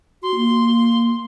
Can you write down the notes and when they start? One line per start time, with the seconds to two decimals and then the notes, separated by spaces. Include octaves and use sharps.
0.23 F#4 C6
0.35 A#3